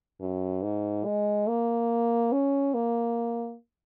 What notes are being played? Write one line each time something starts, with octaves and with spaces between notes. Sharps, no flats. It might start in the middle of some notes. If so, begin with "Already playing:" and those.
F#2
G#2
G#3
A#3
C#4
A#3